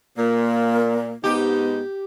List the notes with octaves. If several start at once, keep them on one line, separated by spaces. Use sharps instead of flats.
A#2 A#3
G#2 B3 D#4 G4